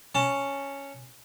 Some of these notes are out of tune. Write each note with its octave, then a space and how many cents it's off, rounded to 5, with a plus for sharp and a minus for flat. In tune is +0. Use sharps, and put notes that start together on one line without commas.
C#4 +0 A5 +25